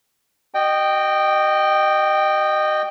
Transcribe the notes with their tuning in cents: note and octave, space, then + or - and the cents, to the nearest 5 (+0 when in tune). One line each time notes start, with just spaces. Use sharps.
F#4 +40 D#5 -20 G5 +0